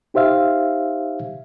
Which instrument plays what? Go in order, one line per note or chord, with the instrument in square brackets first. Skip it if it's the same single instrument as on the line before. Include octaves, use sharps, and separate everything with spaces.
[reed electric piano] D#4 G4 C5 E5 F5